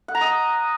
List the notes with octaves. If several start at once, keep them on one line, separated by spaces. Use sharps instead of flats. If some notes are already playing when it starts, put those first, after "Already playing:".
F#5
A#5
D#5